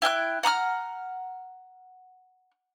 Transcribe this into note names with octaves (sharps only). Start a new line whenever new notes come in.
E4 G5 F6 F#6
F#5 A#5 D#6 F6